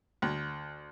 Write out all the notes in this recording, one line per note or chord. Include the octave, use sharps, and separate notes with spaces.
D2